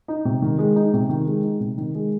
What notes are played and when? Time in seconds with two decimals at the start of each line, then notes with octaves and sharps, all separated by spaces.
0.08 D#4
0.25 C3
0.42 D#3
0.58 G#3
0.76 D#4
0.94 C3
1.09 D#3
1.26 G#3
1.43 D#4
1.60 C3
1.78 D#3
1.95 G#3